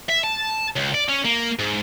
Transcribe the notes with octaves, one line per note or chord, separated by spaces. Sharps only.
E5
A5
C#2
D5
C#4
A#3
G#2